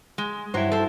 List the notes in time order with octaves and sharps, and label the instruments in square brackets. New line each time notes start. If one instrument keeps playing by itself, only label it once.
[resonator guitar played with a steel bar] G#3
[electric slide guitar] G2 E4 [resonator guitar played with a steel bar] F#3 C5
[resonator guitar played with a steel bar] A4 C5